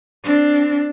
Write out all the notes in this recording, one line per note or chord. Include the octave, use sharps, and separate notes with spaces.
C4 D4